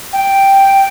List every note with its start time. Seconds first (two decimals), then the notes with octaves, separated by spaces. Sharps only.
0.13 G5